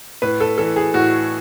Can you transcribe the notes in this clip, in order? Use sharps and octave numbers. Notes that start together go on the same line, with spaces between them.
A2 B4
A4
E3 A4
G#4
A2 F#4